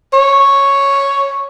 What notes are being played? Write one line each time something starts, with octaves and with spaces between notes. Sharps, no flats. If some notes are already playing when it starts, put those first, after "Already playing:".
C#5